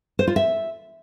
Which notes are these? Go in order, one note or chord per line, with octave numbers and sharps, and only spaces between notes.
C5
F4
E5